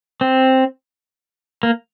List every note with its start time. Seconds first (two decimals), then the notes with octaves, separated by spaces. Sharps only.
0.21 C4
1.63 A#3